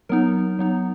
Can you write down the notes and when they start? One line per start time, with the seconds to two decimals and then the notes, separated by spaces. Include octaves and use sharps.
0.09 F#3 B3 D#4 A#4
0.59 F#3 B3 D#4